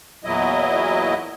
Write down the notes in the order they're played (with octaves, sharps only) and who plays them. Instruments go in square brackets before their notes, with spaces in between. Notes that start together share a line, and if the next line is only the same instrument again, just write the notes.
[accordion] E2 A#2 F#3 E4 D#5